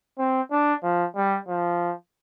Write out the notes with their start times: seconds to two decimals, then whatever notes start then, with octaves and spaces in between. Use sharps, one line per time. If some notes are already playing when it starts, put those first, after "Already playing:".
0.19 C4
0.51 D4
0.83 F3
1.16 G3
1.48 F3